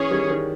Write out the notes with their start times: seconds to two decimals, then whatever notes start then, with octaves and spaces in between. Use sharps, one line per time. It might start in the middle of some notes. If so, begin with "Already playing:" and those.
Already playing: E3 C#4 G#4 C#5
0.11 D#3 G3
0.30 D#3